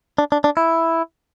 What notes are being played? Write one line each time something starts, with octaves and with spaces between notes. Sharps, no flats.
D4
D4
D4
E4